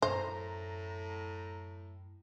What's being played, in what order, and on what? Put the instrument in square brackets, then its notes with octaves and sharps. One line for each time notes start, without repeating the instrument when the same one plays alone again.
[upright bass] F#2 D#4 [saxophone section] A2 [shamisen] C5 [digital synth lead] A#5